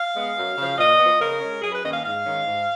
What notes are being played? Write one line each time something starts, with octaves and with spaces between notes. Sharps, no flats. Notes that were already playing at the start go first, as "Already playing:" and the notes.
Already playing: F5
G#3 B3
F#2
C#3 F3
A#2 D#5
F3 B3
C#3 A#4
G#3 C#4
F#2 G#4
B4
D#3 A#3 C#4 D#5
F5
G#2 F5
D#3 G#3 C#4
G#2